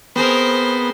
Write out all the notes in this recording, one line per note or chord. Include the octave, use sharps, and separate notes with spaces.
B3 C4 G#4 A#4 C5